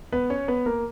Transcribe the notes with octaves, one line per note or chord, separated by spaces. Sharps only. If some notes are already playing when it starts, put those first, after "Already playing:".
B3 B4
C#4 C#5
B3 B4
A#3 A#4